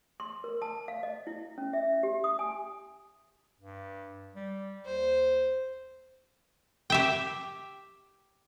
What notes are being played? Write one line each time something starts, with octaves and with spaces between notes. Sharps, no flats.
C6
A#4
A5
F5
D#5
E4
C#4
E5
G4
D#6
G#5
G2
G3
D#2 C5
G4 E5 G5